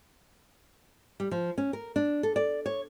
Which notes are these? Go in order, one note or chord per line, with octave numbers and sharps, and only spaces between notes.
G3
F3
C#4
A#4
D4
A4
D5
C#5